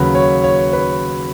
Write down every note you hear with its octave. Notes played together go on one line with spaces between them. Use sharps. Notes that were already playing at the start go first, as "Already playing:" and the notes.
Already playing: D#2 C#3 F#3 B4
C#5
C#5
B4